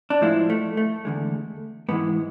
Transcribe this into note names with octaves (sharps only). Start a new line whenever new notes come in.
D4
A2 F3 G#3 E4
A3
A3
E2 D3 G#3
G#2 E3 G#3 B3